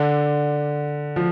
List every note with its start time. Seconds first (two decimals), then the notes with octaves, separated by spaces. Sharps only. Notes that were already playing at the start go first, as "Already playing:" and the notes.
Already playing: D3
1.16 F3